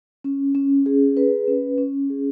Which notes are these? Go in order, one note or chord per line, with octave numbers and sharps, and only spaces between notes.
C#4
C#4
G#4
B4
C#4
C#4
G#4